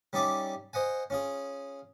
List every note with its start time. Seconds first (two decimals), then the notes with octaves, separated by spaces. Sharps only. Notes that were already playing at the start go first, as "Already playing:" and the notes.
0.13 G3 C#4 D#4 D5 E5 D6
0.73 C5 D#5 F#5 G#5
1.10 C#4 F4 G#4